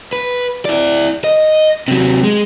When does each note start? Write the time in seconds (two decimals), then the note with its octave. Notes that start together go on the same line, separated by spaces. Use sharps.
0.13 B4
0.65 E4 D5
1.24 D#5
1.88 C3 F#3
2.24 G#3